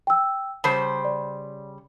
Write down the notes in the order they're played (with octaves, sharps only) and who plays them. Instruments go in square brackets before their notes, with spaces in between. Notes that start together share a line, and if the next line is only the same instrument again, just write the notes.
[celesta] G5 E6
[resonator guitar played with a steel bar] C#3 G3 C5 [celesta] A5
[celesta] D5